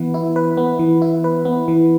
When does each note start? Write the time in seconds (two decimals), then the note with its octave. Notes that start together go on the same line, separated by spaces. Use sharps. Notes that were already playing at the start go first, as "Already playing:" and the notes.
Already playing: E3 B3 E4 B4
0.14 E4
0.36 B4
0.57 B3
0.79 E3
1.02 E4
1.24 B4
1.45 B3
1.68 E3